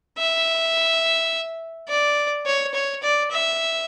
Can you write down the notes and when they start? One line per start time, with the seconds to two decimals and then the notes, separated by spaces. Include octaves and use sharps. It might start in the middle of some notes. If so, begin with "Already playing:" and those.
0.18 E5
1.89 D5
2.46 C#5
2.74 C#5
3.03 D5
3.31 E5